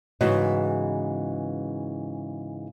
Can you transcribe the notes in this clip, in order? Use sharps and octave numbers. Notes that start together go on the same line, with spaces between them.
G#2 C#3 E3 B3 F#4 D#5